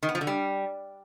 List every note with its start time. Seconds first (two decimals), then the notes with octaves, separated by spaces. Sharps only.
0.03 D#3
0.09 B3
0.15 F3
0.21 D3
0.27 G3